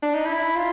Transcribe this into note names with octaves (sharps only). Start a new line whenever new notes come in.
D4
D#4
E4
F4